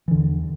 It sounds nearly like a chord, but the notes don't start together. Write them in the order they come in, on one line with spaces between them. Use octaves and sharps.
E3 D3 E2